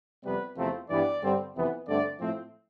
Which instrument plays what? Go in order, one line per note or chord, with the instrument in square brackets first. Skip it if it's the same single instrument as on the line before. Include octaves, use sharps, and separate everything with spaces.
[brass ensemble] F2 C3 G3 B3 B4
E2 C3 F3 A3 C4
G2 E3 G3 B3 D5
G2 D3 G3 C4
F2 C3 E3 B3
G2 D3 A3 C4 D5
A2 F3 A3 C4